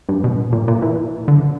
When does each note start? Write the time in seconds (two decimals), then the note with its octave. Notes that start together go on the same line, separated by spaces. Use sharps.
0.09 G2
0.24 B2
0.53 A#2
0.68 A#2
0.82 E3
1.28 D3